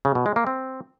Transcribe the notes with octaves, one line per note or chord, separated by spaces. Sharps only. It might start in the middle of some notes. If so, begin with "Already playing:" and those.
C#3
B2
G#3
A#3
C4